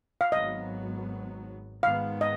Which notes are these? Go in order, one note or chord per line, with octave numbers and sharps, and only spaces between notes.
F5
G#1 G#2 F#3 B3 D#5
G#2 D#3 G#3 B3 F5
D#5